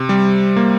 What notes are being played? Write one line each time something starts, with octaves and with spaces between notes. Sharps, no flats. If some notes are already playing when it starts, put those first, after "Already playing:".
Already playing: C3
G3
A#3